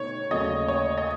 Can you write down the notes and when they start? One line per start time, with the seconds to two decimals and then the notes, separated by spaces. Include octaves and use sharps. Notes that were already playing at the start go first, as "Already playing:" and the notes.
Already playing: B2 A3 D#4 C#5
0.31 D#2 C#3 F#3 A3 D#5
0.68 C#5
0.98 D#5